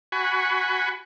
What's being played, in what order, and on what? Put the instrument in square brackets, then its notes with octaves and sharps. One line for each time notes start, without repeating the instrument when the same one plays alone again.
[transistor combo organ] F#4 G#5 B5 C#6